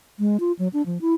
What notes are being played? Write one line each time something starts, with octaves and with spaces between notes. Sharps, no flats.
G#3
F4
F#3
D4
F3
E4